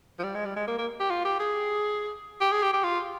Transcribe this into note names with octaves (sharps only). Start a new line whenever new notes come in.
F3
G3
G#3
G3
G#3
A#3
A#3
G4
F4
G4
G#4
G4
G#4
G4
G4
F4